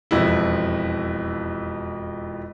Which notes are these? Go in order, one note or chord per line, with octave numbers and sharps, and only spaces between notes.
E1 F2 F3 E4